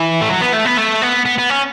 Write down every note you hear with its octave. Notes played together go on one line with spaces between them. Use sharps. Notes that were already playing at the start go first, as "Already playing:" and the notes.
Already playing: E3
A3
F#3
B3
A3
B3
A3
B3
B3
B3
C#4